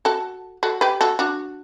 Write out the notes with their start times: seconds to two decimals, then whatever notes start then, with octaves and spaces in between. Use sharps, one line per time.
0.05 F#4 A4
0.63 F#4 A4
0.81 G4 B4
1.01 F#4 A4
1.19 D4 F#4